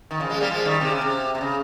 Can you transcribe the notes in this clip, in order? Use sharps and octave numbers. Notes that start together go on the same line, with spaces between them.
D#3
C#3 F3
F3 G#3
G3 A#3
F3 G#3
D#3 G3
C3 D#3
C#3
C3
C3
C#3